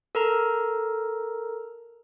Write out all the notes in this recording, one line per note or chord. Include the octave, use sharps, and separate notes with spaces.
A4 A#4 A#5